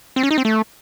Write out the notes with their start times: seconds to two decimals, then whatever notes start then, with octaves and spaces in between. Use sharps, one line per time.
0.16 C4
0.23 C#4
0.31 D#4
0.38 C4
0.45 A3